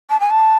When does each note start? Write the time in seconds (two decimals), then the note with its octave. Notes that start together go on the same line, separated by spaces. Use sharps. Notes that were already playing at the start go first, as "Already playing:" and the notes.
0.09 A5
0.20 G#5
0.30 A5